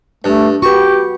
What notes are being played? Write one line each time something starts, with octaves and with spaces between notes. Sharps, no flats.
G2 A3
F#4 G4 B4 C#6